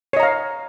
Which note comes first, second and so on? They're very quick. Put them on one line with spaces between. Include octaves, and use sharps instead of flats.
C#5 D#5 A#5 F5